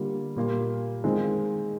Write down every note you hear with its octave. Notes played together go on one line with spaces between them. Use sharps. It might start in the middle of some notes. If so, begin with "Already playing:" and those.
Already playing: D3 G3 A#3 F4
A#2 G3 A#3 F4
D#3 G#3 C4 F4